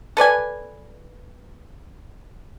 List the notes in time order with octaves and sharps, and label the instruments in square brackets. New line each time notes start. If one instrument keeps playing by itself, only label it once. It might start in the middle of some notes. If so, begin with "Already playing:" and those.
[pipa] A4 B4 D5 G#5